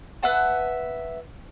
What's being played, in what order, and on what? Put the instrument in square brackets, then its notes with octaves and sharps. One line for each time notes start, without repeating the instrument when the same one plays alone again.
[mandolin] B4 E5 F#5 A5